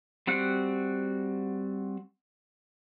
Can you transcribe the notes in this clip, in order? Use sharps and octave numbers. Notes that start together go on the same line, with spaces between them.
G3 C4 F#4 F#5